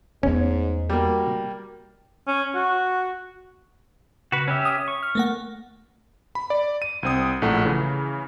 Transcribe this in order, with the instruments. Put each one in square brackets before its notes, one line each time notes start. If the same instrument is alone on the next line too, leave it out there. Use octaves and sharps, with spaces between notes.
[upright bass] E2 A3 [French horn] G#2 [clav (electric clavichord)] C#4
[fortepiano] G3 A#3 [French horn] F#4
[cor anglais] C#4
F#4
[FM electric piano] C#3 [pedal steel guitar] F#4 B4
[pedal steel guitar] C#4 G4 E5
[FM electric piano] D#6
[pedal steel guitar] C#6
[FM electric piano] F6
A3 A#3 F#5
[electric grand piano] B5
D5
D#7
C2 C4 D#6
A#1 A2 A3 F#5
C#3 E3